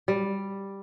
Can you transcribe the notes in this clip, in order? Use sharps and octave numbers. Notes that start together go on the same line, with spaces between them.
G3